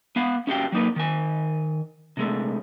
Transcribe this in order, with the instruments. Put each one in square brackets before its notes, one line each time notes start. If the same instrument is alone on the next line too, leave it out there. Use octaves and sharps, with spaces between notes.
[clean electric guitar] B3 F5 F#5
C#4 E4 F#4 G4 F5 G5
F#3 A#3 D#4 B4
D#3 G#5
C3 G#3 A3